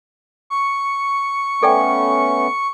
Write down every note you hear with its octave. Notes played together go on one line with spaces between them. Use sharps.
C#6
A3 B3 C#4 A4 D5 G5